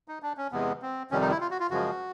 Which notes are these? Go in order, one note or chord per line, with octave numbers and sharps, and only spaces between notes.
D#4
D4
C#4
E2 C3 E3 G#3 B3
C4
F2 C3 D#3 G3 C#4
D#4
E4
F4
F#4
F4
F#2 C#3 F3 G#3 F#4